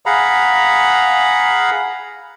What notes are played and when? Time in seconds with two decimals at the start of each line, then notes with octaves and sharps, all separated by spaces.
0.06 G#4 F5 F#5 A#5 B5